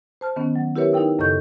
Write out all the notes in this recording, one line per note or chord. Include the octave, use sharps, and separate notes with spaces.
C5 A5 F6
D#3 B3 C#4
F#3
E4 G4 A#4 B4 C#5 E5
D#4 E4 A#4 G5 E6
F#2 C#3 A4 D#5 C#6 G6